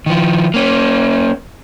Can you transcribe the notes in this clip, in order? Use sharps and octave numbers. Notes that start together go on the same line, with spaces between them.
D#3 F3
A#3 C#4